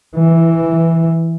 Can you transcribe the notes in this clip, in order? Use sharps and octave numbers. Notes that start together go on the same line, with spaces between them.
E3